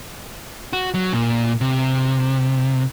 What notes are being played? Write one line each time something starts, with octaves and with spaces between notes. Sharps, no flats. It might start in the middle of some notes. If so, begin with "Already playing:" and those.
F#4
F#3
A#2
C3